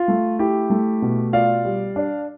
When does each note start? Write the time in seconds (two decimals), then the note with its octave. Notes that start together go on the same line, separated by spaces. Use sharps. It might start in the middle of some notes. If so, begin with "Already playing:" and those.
Already playing: F4
0.08 A3
0.39 E4 G4
0.70 A3
1.02 B2
1.33 F4 D5 F5
1.65 G3
1.96 D4